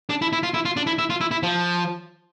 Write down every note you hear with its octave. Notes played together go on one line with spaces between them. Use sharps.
D4
E4
E4
F4
E4
F4
D4
E4
E4
F4
E4
E4
F3